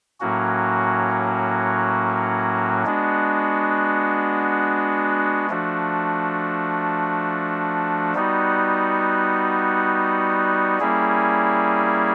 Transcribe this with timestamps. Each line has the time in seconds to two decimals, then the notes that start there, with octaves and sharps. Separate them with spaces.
0.20 A2 F#3 A#3 C#4 F#4
2.85 G#3 B3 D4 F#4
5.50 F3 A3 D4 F#4
8.15 G3 B3 D#4 F#4
10.80 G3 A#3 C#4 E4 G#4